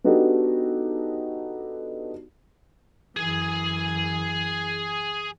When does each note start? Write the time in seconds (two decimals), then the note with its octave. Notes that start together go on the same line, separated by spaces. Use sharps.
0.04 B3 D4 D#4 F#4 G4 A4
3.17 F#2 E3 G#4 G#5